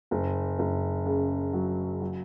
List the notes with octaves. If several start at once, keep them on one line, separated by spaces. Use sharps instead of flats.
F#1
F#1
C#3
F#3
F#3